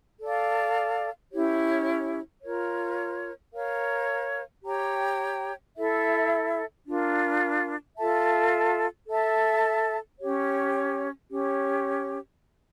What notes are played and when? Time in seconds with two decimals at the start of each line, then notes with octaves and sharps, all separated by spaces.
0.20 A4 D5 F5
1.31 C#4 E4 G4 C#5
2.42 F4 A#4 C#5
3.53 A#4 C#5 F5
4.64 G4 C#5 G5 A#5
5.75 E4 A4 E5
6.86 D4 F4 A#4
7.97 F4 A4 E5 A5
9.08 A4 E5 A5
10.18 C#4 G4 C#5
11.29 C#4 G4 C#5